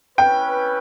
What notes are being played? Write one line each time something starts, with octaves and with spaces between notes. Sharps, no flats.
C#4 E4 B4 G5